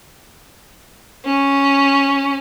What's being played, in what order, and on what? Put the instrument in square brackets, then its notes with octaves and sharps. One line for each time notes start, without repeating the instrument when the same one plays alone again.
[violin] C#4